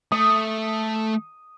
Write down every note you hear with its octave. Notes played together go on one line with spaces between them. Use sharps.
A3 D#6